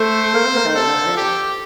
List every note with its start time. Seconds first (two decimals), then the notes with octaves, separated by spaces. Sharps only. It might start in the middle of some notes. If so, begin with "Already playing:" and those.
Already playing: A3 C5
0.34 A#3
0.45 C4
0.56 A#3
0.66 D#3
0.75 C3 A4
0.86 D3
0.97 D3
1.06 F3
1.17 G4